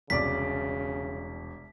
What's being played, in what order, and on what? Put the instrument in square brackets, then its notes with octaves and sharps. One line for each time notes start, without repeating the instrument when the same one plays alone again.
[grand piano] E1 [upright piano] C2 D5 D6 [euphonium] C#3 [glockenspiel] B6